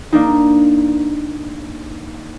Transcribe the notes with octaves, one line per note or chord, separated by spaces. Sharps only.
A#3 D4 D#4